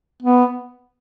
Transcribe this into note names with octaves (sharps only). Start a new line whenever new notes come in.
B3